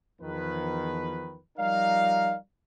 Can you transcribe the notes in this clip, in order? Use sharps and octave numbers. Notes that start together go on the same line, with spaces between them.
E2 D#3 F3 B4
F3 G3 D#4 A#4 D5 F5